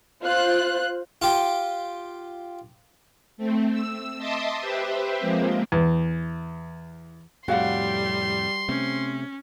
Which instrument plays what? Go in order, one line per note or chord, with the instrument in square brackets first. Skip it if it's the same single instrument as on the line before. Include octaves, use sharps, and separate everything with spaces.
[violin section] F4 C5 F#6
[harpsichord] F4 G4
[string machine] A3 C4
E6
D#5 E5 A5 C6 D6 D#6
G4 B4 C5 E5
F3 G#3 A#3 C4
[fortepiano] E2
[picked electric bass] F2 A2 C3 [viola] G3 [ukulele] F#4 F5 F#5 [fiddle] C6
[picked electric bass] C3 A3 C4 [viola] C#4